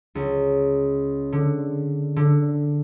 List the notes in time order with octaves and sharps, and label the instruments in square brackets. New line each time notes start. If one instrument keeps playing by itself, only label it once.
[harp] C#2
D3
D3